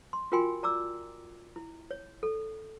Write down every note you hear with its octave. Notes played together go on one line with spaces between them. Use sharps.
C6
F4 F#4 A#4 G5 G#5 C6
D5 A#5 D6 E6
E4
C#5
A4